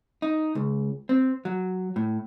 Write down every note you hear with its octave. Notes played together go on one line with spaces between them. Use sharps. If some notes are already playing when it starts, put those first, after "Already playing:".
D#4
C#2
C4
F#3
A2